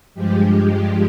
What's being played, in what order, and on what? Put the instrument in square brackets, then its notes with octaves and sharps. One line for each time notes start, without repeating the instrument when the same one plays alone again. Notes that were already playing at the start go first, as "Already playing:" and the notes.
[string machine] G2 F3 G#3 G4